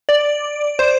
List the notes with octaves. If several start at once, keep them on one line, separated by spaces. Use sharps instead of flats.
D5
C5